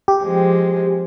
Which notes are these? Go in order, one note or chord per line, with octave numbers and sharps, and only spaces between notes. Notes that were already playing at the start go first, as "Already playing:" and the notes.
G4
F3 G#3 C4